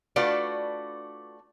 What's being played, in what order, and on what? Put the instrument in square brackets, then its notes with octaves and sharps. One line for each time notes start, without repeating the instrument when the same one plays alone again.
[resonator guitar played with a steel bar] A3 D4 F4 F#4 B4 D5